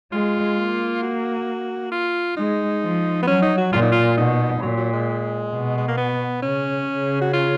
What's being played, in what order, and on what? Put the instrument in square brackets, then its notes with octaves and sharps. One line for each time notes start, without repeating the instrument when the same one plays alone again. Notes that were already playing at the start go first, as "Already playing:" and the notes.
[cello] G#3 [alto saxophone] F4
[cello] A#3
[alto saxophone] F#4
F4
[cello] G#3 [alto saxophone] D#4
[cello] F3
[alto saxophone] B3
[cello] F#3 [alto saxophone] C#4
[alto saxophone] D#4
F#4
[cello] A#2 [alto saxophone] F4
[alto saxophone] D#4
F4
[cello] B2 [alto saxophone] D#4
[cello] A#2 [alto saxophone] F#3
[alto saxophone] F#3
G#3
[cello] B2
[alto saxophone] G#3
A#3
B3
[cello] C#3 [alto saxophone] C#4
[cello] C#3
[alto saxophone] F#4
F4